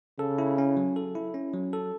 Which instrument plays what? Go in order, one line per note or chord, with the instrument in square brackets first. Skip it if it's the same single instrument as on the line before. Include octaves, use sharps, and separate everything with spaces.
[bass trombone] C#3 [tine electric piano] A4
[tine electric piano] E4
C#4
F#3
A4
E4
C#4
F#3
A4